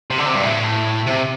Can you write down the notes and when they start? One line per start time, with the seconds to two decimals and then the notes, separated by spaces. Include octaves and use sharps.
0.11 C3
0.18 D3
0.26 C3
0.34 G2
0.43 A2
1.07 C3